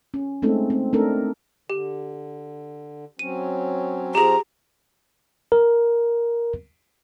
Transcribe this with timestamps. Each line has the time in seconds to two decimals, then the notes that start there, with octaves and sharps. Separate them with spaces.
0.14 C#4
0.42 G#3 A3 C4 C#4 D#4 A4
0.70 C4
0.93 A3 C4 D4 D#4 A4 A#4
1.70 D3 G4
3.19 F#3 C4 C#4 D#7
4.15 F3 C4 F4 G4 G#4 A#5
5.52 A#4